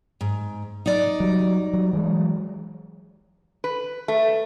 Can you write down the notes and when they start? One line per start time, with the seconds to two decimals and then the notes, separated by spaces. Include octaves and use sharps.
0.21 G#2
0.86 D#4 D5
1.20 F#3 G3
1.74 F#3 G3
1.93 E3 F#3 G#3
3.64 B4
4.08 A3